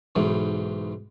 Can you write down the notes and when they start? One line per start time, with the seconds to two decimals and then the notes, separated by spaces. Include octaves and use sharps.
0.16 B1 G#2 E3